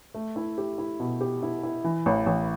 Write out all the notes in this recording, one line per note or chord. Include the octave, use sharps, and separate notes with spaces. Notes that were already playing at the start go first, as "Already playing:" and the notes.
A3
E4
G4
E4
B2
G4
E4
E4
E3
A1
A1